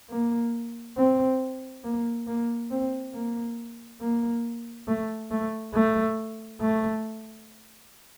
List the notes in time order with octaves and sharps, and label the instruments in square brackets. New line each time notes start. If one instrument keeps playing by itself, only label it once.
[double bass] A#3
C4
A#3
A#3
C4
A#3
A#3
A3
A3
A3
A3